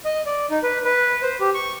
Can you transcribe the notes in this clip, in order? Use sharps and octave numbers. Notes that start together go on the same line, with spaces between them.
D#5
D5
D#4
B4
B4
C5
G4
C#6